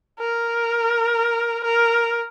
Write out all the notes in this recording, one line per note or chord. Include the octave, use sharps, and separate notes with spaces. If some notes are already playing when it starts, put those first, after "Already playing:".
A#4
A#4